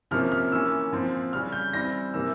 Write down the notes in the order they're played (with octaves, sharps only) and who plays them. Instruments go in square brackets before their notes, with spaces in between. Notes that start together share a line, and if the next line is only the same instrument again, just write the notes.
[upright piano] C3 F3 A#3 C#4 F6
F6
E3 A#3 C#4 E6
A#2 F3 C4
C#3 G3 C#4 F6
G6
E3 G3 C4 A#6
C3 E3 A#3 E6